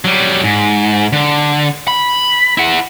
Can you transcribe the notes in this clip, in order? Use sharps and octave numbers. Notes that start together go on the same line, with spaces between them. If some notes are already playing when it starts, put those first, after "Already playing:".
F#3 G3
G#2
D3
B5
E4 F#5